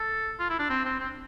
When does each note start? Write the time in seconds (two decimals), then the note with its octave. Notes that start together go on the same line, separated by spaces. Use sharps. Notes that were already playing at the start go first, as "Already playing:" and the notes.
Already playing: A4
0.39 F4
0.50 E4
0.59 D4
0.70 C4
0.85 C4
1.00 C4